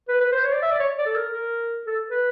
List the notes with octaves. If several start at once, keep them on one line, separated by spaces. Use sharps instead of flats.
B4
B4
C5
C#5
D5
E5
D5
C#5
D5
A4
A#4
A#4
A4
B4